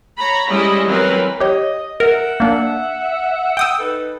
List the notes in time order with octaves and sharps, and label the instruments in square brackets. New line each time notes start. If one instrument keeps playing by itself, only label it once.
[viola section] C#5 A#5 B5
G3 G#3 C#4 E4 D#5
E3 F#3 C4 A#4 B4
[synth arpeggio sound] G4 C#5 [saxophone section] D#5
[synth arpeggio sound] A#4 [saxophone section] E5 F#5
[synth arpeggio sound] A#3 D4
G5 D#6 E6
[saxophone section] D#4 A4 B4